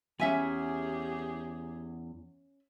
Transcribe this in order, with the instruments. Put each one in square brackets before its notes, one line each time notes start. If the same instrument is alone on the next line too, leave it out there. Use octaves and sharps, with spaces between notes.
[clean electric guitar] E2 [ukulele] C#4 E5 G#5 [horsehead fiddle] G4 G#4